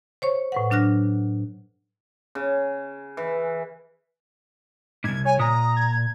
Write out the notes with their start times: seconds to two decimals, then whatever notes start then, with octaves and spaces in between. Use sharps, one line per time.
0.22 C5 C#5 C#6
0.52 A2 B4 F#5
0.71 F#3 D4 F6 F#6 A#6
2.35 C#3
3.17 E3
5.04 C2 G#2 G#6
5.25 C#5 G#5
5.39 A#2 A#5 D#6
5.77 G#6